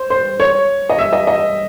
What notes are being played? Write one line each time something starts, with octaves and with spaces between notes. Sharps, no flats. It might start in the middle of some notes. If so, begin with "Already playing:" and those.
Already playing: C5
C5
C#5
D#5
E5
D#5
D#5